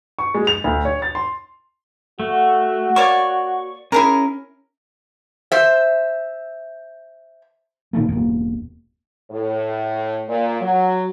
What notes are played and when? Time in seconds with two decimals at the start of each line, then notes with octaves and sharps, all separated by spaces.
0.19 C#6
0.34 G#3
0.47 F7
0.64 D2
0.85 C#5
1.02 A6
1.15 C6
2.20 A3 F#4
2.96 A#3 C#5 D5 C#6
3.92 C#4 E4 G#4 A#4
5.52 C5 E5
7.93 A#2 D#3 A3 A#3
8.09 E1 A#3
9.31 A2
10.27 A#2
10.60 F#3